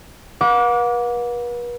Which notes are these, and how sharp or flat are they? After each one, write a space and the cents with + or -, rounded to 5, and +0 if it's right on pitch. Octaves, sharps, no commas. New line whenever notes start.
B4 -40 F#5 -45 D6 -15